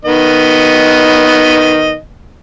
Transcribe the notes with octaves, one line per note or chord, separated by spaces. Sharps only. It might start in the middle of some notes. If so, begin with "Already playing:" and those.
D#3 B3 D#5